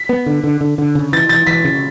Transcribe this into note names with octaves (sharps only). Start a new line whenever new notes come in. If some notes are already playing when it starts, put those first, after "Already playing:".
Already playing: B6
B3
D3
D3
D3
D3
C#3
E3 A6
E3 A6
E3 B6
C#3